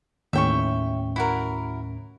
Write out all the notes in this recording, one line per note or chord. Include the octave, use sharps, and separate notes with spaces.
D#2 A2 C#4 E5 G5 C#6
E4 F#4 A#4